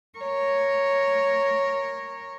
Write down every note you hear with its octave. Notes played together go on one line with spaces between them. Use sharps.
A#4 C#5